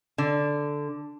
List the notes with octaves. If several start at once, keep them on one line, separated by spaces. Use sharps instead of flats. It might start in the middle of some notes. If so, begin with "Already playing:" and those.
D3